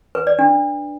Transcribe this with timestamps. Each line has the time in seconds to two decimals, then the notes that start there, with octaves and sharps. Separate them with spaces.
0.15 B4
0.27 D5
0.39 D4